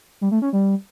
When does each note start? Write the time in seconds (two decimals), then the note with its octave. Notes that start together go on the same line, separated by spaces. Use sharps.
0.21 G3
0.31 A3
0.42 C#4
0.53 G3